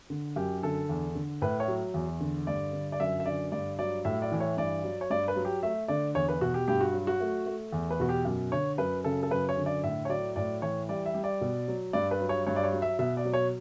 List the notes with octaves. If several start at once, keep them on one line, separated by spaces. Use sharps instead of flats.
D3
F#2 G4
D3 A4
E2
D3
A2 B4
C#5
F#3
E2
D3
G2 D5
D3
D5
F#2 E5
E5
D3 D5
G2 D5
F#3 D5
A2 E5
D5
E3
C#5
G2 D5
F#3
C#5
G2 D5
B4
F#3
G4
A3 E5
D3 D5
E2 C#5
B4
B2 F#4
G4
G2 G4
F#4
F#3
F#4
A3
A3
E2
B4
B2 F#4
G4
F#2
D3 C#5
F#2 B4
C#3 A4
A4
F#2 B4
C#5
D3
D5
A2 E5
C#5
F#3 D5
A2 D5
E3 C#5
G3 D5
E5
G3
D5
B2
F#3
G2 D5
B4
F#3
C#5
G2 C#5
D5
C#5
F#3
E5
B2 E5
D5
F#3
C#5